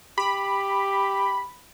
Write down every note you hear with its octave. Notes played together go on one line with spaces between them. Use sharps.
G4 B5